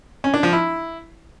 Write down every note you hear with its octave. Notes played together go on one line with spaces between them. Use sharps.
C#4
D4
F3
E4